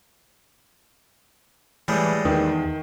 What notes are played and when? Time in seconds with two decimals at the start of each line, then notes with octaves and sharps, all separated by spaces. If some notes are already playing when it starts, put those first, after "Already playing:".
1.88 A2 E3 G3 G#3
2.25 E2 D#3